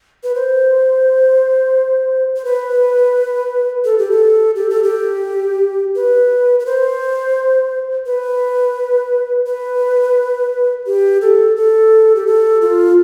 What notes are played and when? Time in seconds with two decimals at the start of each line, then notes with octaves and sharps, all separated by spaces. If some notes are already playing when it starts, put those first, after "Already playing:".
0.23 B4
0.35 C5
2.36 C5
2.45 B4
3.85 A4
3.98 G4
4.11 A4
4.56 G4
4.70 A4
4.83 G4
5.96 B4
6.60 B4
6.66 C5
8.06 B4
9.46 B4
10.86 G4
11.21 A4
11.56 A4
12.15 G4
12.27 A4
12.61 F4